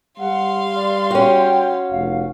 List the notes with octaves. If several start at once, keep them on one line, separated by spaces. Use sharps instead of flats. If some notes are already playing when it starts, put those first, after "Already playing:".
G3 F5 F#5 C6
D5
C#4 F#4 G5
F1 F5